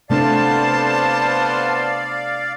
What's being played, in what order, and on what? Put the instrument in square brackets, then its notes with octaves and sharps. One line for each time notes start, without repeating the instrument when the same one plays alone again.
[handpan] C3 A3 D4 [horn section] B3 C5 [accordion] D5 F5 [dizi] A5